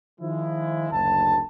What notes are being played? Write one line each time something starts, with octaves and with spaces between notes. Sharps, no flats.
D#3 F3 G#3 E4
F#1 D2 A5